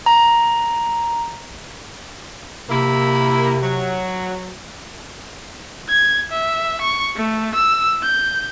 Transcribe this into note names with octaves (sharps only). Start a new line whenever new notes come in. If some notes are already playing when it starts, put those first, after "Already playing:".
A#5
C3 A#3 E4
F#3
G#6
E5
C#6
A3
E6
G6